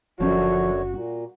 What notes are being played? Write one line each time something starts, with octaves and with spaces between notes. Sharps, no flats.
F#1 F#2 A2 D3 F3 C#4 F#4 C#5
A#2 F#4